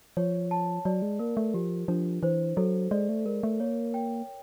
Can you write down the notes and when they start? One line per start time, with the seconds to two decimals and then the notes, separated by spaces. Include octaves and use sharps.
0.17 F3 C#5
0.51 A5
0.85 F#3 D5
1.02 G#3
1.19 A#3 A#4
1.37 A3
1.54 F3 G4
1.88 F3 D4
2.23 E3 C5
2.57 F#3 A4
2.91 G#3 D5
3.09 A3
3.25 G#3 A#4
3.43 A3
3.60 A#3 C#5
3.94 G5